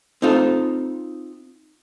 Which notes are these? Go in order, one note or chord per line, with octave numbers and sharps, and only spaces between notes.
C4 D#4 F4 A4